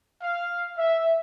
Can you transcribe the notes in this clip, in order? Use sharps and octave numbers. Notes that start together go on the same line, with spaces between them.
F5
E5